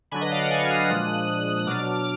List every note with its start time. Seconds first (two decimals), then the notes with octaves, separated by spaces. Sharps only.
0.11 D3 F#3 D4 G#5 B5
0.21 B4 D#5
0.31 D5 F5
0.41 D#5 F#5
0.51 F5 G#5
0.65 F6
0.70 D#6 F#6
0.90 A#2 F3 G#3 D4
1.59 D#6
1.66 B2 F#3 D4 D6 F6
1.86 D6 F6